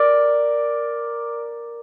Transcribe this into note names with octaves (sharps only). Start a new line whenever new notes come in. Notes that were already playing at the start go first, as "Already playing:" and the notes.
Already playing: A#4 D5